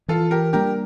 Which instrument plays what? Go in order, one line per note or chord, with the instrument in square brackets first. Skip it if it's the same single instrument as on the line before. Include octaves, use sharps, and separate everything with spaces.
[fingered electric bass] E3 [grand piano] F4 A4
[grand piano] G4 A#4
[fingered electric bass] G3 A#3 D4 [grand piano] G4 A#4